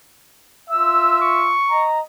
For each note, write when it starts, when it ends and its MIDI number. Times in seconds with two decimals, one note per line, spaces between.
0.70 1.54 65
0.70 1.54 76
0.70 1.18 88
1.22 1.87 85
1.70 2.01 75
1.70 2.01 82